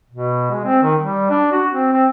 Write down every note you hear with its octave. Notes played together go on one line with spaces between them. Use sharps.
B2
G#3
C4
D#3
G3
D4
F#4
C4
C4